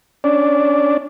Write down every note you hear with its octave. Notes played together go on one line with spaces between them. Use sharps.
C#4 D4 D5